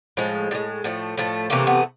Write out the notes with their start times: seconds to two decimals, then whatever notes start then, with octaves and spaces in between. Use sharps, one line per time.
0.17 A2 F3 G#3
0.51 A2 F3
0.55 G#3
0.84 A2 F3 A3
1.17 A2 F3 A3
1.50 C3 E3 A3 A#3
1.67 B3